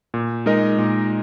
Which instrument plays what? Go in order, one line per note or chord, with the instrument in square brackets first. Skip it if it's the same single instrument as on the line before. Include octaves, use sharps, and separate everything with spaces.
[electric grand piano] A#2
G#3 D#4 A#4 D#5
A#2